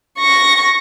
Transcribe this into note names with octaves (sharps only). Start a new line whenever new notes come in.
C#6 A#6